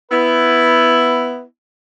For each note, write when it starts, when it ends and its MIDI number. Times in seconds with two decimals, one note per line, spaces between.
0.11 1.42 59
0.11 1.42 64
0.11 1.42 71